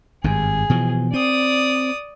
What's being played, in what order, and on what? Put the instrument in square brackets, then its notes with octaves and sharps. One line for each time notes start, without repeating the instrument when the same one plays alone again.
[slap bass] G#1 G2 [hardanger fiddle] G#4
[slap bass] B2 E3 F3
[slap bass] C4 [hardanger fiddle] D5 D#6